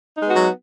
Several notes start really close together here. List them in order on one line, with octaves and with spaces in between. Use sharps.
D#4 G#3 B3 F#4 F#3